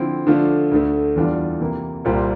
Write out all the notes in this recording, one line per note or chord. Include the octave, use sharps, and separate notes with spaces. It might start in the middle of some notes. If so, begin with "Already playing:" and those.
Already playing: D3 F3 C4 E4
D3 F3 A3 D4 F4
D2 D3 A3
E2 E3 G3 D4 F4
C3 E3 A#3 E4
C2 A#2 G3 C4 F4